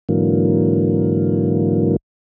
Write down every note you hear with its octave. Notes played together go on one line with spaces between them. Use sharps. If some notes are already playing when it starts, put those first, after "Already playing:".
G#2 D3 E3 F#3 A#3